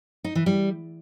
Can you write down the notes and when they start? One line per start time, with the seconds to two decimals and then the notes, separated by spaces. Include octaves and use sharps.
0.24 D#4
0.35 E3
0.46 G3